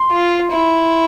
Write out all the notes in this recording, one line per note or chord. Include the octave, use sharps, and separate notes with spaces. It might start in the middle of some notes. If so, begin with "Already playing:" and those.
Already playing: C6
F4
E4